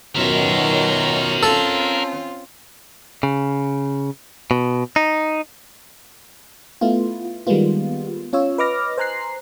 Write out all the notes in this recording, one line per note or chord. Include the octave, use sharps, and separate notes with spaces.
F#2 B2 D#3 F4 A#4 C#5 E5 A#5
C4 C#4 F4 A4
C#3
B2
D#4
A3 B3 E4 F4
D#3 G3 G#3 A#3 B3 F4
C#4 F4 C#5 E6
B4 D#5 D6 F6 A#6
C5 G#5 A#5 F#6 C7